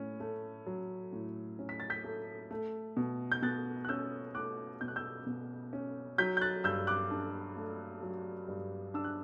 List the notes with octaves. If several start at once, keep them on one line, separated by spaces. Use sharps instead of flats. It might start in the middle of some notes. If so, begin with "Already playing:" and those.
Already playing: A2 C#4
A3
F#3
A2
C#4
B6
A6
G6 B6
A3
A3
B2
G6
B2 F#6 A6
F#6
C#4 E6 G6
A3 D6 F#6
B2 G6
F#6
E6 G6
B2
C#4
F#3 G6 B6
G6
F#6 A6
G2 E6 G6
D6 F#6
D4
A3
F#3
G2
D4 E6
F#6